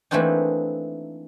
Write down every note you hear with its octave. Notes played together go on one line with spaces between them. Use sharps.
E3 A3 A#3 C4 D4 D#4